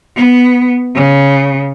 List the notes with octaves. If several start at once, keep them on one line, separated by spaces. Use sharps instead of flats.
B3
C#3